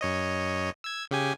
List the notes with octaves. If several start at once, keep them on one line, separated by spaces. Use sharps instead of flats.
F#2 C#5 D#5
E6 G#6
C#3 G4 G#5